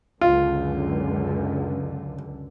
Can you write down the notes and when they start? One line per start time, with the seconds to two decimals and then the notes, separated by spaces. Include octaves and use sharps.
0.21 C#2 F#2 D3 F4